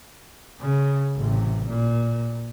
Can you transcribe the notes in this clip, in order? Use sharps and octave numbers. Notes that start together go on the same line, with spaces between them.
C#3
A1 C3
A#2